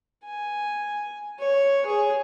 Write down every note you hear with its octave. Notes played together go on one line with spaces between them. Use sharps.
G#5
C#5
G#4